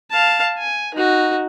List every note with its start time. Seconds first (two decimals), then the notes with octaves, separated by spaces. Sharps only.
0.11 F5 A5
0.58 G#5
0.94 D#4 F#4